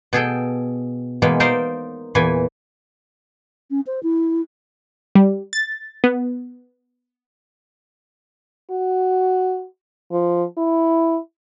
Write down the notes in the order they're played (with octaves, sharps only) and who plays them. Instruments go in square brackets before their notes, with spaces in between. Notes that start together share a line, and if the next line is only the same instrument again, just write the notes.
[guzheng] B2 G#4 A4 G5
B2 E3 G#3 A#3
D#4 A#4 C5 D5 D#5 F5
E2 A#2 E3 G#5
[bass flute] C#4
C5
E4
[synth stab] G3
A6
B3
[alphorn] F#4
F3
E4